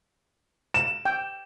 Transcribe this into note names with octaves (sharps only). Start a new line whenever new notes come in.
E7
G5